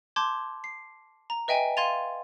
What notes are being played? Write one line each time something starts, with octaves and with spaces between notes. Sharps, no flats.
A5 C6 D6 G6 G#6
C7
A#5
B4 D#5 E5 G5 G#5
F5 C6 G#6 A6 D#7 F7